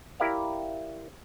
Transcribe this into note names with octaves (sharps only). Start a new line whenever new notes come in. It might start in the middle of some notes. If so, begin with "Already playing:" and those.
E4 G4 A#4 D5 E5 F5